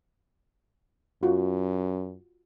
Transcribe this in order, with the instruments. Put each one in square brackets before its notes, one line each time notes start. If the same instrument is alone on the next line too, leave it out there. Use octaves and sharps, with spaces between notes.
[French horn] F#2 [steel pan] F4 F#4